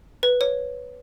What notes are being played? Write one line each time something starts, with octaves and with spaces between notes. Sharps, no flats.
B4
C#5